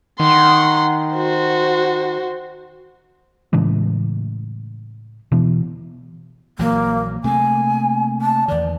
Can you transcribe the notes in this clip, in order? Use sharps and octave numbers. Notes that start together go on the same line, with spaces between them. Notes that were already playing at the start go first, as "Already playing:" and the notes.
D#3 F#5 C6
F#4 C5
A2 C#3 E3 G#3
B2 E3
A#1 E3 F#3 A#3
C3 A3 A#3 G#5
A5
E2 D#3 D5